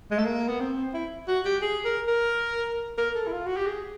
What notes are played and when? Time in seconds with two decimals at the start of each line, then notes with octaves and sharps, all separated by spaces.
0.11 G#3
0.18 A3
0.26 A#3
0.48 B3
0.60 C4
0.94 E4
1.28 F#4
1.45 G4
1.62 G#4
1.85 A#4
2.08 A#4
2.98 A#4
3.15 A4
3.27 E4
3.32 F4
3.46 F#4
3.57 G4
3.66 G#4